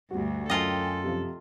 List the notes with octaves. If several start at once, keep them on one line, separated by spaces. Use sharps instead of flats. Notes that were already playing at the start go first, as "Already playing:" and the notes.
D2 G2 G3 F#4
F#2 F4 A4 D#5 G5 G#5
C3 F3